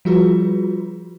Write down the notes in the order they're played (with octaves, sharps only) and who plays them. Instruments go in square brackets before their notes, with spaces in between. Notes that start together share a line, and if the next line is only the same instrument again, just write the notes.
[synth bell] F3 G3 F4 F#4 G#4 B4